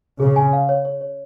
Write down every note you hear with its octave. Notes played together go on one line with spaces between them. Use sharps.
C#3 G#4
G#5
F5
C#5
C#5
C#5